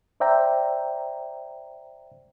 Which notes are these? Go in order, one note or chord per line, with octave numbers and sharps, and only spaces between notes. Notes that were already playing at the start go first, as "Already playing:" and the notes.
C5 D5 E5 G5 A#5